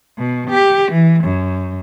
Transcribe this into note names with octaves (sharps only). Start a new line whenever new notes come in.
B2
G4
E3
F#2